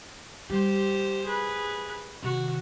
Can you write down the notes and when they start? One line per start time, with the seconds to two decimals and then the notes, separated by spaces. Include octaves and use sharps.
0.50 G3 G4 C5
1.25 G#4 B4
2.23 C3 D#3 F#4